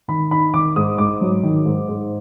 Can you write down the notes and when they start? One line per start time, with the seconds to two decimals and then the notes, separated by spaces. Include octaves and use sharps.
0.08 D#3 B5
0.31 D#4 B5
0.54 D#3 D6
0.76 G#2 D#6
0.98 G#2 D6
1.21 F#3
1.43 D#3
1.65 G#2
1.89 G#2